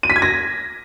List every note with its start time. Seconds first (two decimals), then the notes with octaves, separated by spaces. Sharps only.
0.03 D#7
0.10 B6
0.16 G#6
0.22 A#6